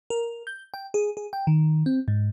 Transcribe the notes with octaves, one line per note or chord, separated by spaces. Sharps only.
A#4
G6
G5
G#4
G#4
G5
D#3
C4
G#2